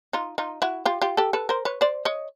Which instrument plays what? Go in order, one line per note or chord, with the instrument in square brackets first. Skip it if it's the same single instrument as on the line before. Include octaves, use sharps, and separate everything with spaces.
[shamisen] D#4 F4
D#4 F4
E4 F#4
F4 G4
F4 G4
G4 A4
A4 B4
A#4 C5
B4 C#5
C5 D5
C#5 D#5